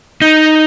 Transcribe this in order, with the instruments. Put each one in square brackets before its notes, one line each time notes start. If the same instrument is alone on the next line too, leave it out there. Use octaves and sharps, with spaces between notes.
[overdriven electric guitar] D#4